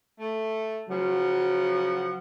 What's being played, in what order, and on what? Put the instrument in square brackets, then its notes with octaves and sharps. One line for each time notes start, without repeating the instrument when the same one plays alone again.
[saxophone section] A3
[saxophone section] C#3 F3 F#5 [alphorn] F#3